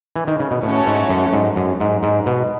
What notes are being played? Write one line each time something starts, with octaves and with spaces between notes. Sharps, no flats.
E3
D#3
C#3
B2
A2 A3 C#4 F#4 A4 C#5
G#2
F#2
G#2
F#2
G#2
G#2
B2